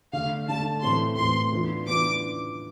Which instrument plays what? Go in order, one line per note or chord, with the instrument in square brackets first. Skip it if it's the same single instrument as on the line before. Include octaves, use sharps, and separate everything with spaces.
[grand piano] D3 A3 D4 [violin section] F5
[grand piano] D3 A3 D4 [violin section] A5
[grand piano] A2 E3 A3 C4 [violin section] C6
[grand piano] A2 E3 A3 C4 [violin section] C6
[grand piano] E3 B3 D4 F4
[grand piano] E3 B3 D4 F4 [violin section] D6